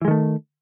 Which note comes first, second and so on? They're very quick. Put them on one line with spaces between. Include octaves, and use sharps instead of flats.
E3 G#3 D#3 A3